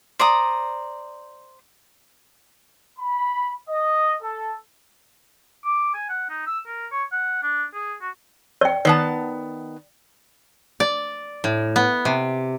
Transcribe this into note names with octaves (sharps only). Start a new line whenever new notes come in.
C5 D5 A#5 D#6
B5
D#5
A4
D6
G#5
F#5
D#4
E6
A#4
C#5
F#5
D4
G#4
F#4
D5 G5
D#3 B3 D5 A5
D5
A2
B3
C3